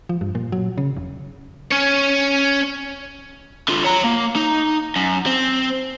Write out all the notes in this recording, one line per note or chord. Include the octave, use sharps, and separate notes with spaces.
F3
G2
A#2
F#3
C#3
F1
C#4 C#5
D3 F4
C#5 A#5
A#3
D#4
F#2
C4